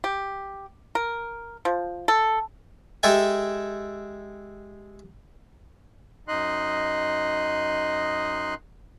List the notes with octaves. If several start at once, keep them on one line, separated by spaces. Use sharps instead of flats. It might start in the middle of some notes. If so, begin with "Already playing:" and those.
G4
A#4
F3
A4
G#3 G4 A4 E5 G#5
F#2 D#4 D#5 C6 F#6